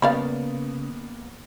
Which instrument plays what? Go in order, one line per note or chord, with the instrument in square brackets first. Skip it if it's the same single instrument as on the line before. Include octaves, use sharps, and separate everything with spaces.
[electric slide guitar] C#3 [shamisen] G3 D5 F5 [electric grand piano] A#3 B3 [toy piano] B5